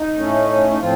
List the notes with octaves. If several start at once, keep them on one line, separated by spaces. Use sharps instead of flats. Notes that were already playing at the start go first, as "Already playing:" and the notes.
Already playing: D#4
A2 A3 C#4
D#4
A2 F3 C4 F4